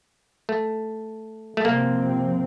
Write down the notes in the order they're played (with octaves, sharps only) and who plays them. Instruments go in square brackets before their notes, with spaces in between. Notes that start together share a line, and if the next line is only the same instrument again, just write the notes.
[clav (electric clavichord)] A3
A3
[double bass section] C3 F3 C4 [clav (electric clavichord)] A#3